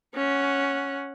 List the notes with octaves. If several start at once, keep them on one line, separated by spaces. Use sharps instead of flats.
C#4 F#5